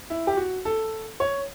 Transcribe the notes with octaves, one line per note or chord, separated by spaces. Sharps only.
E4
G4
F#4
A4
C#5